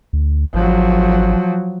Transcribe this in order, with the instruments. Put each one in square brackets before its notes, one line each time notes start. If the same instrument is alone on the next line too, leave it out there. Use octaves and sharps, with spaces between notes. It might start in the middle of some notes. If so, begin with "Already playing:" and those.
[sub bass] D2
[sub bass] G#1 [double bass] F3 F#3